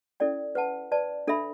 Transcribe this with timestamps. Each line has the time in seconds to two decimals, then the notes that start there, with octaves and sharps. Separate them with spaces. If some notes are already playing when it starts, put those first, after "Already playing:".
0.20 C#4 E4 A4 D5 G5
0.55 B4 F#5 A5
0.92 B4 D5 A5
1.27 D4 A4 E5 B5